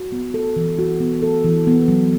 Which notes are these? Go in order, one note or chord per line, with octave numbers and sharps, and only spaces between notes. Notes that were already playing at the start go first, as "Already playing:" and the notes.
Already playing: F#4
B3
A4
E3
F#4
B3
A4
E3
B3
F#3